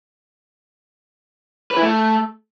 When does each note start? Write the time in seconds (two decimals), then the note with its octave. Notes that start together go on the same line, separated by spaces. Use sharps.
1.71 B4
1.77 E4
1.82 A3